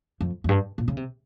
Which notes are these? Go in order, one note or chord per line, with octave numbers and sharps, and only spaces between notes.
F2
F2
G2
A#2
C#3
C3